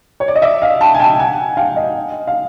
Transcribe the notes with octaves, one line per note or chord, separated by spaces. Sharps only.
C#5
D5
D#5
D5 E5
D#5 F5
G5 A5
G#5
G5 A5
F#5 G#5
F5 G5
D#5 F5
F5